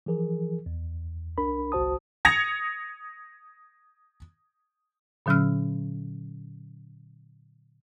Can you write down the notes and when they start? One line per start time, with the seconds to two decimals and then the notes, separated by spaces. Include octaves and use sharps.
0.06 E3 F3 G#4 A#4
0.66 E2
1.38 C2 D4 A#4 B5
1.72 G1 C2 F#4 C5 A5 D#6
2.25 D#6 G#6 A#6 C#7 F7
5.26 A#2 D3 F#3 C#4 E6 F6